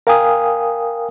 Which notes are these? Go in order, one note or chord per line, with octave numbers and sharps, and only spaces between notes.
A#4 F5 G5 G#5 D#6